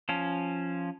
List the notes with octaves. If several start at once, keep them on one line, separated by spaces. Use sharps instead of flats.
F3 C#4